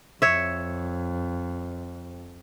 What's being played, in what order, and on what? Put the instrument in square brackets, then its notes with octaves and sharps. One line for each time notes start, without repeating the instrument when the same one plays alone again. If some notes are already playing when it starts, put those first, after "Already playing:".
[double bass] F2 [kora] C#5 E5